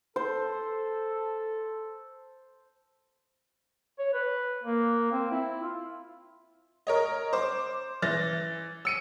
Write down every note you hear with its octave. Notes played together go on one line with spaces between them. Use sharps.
A4 C5
C#5
B4
A#3
C4
E4
F4
A#4 C#5 D#5
C5 D6
E3 A6 A#6
E6 C#7 D#7